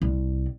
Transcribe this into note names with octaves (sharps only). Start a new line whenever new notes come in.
C2